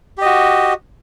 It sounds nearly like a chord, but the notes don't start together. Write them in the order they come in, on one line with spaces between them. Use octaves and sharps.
G4 D#5 F#4